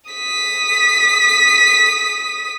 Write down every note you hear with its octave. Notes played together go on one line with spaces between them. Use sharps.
D#6 B6